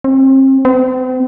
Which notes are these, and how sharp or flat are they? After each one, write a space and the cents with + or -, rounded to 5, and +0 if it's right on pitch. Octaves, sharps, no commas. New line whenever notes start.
C4 +35
C4 -40